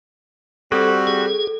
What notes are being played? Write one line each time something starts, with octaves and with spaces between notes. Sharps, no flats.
G3 C4 F#4 A4
G#4